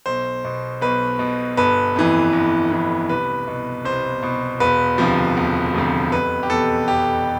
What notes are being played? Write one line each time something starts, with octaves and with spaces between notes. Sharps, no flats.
B1 C5
B2
B1 B4
B2
G1 B4
F2 E3
G1
F2 E3
C2 B4
B2
C2 C5
B2
E1 B4
D2 C3 F3
E1
D2 C3 F3
F1 B4
G4
E2 B2 A4
F1 G4